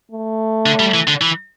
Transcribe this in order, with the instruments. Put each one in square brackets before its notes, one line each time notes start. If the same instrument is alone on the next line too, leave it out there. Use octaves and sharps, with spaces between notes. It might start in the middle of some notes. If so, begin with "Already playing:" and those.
[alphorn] A3
[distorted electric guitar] D3
G3
E3
D3
E3